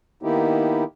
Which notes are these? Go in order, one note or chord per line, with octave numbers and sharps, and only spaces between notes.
D#3 A#3 B3 D#4 E4 G4